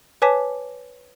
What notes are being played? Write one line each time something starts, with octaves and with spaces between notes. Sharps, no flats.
B4 C#5 G#5 A5 D6 B6